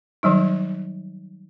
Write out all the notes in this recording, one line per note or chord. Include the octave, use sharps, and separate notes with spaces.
D#3 F#3 G3 D#4